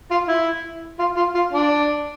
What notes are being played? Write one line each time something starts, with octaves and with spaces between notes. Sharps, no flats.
F4
E4
F4
F4
F4
D4